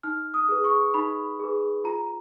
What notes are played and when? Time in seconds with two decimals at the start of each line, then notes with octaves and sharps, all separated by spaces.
0.03 D#4 F6
0.34 D#6
0.49 G#4 B4
0.64 C#6
0.94 D#4 B5
1.39 G#4 B4
1.84 F4 A#5